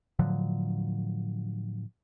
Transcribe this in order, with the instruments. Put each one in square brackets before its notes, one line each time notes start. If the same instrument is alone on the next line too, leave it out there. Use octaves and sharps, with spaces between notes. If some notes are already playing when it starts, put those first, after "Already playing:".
[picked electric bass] A2 D3 F3 F#3